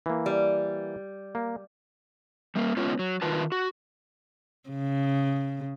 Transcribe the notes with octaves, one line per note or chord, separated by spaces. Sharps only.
E3 A#3
G3
A#3
G3 A#3
G#3 B3 C#4 F4
F#3
D#3 F4 B4 A5
F#4
C#3